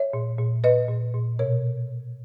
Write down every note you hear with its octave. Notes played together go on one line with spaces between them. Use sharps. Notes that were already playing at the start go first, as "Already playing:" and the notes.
Already playing: C#5 E5
A#2
A#2
A#2 B4 D#5
A#2
A#2
B2 A#4 C#5